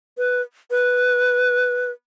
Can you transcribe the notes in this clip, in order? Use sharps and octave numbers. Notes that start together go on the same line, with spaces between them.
B4
B4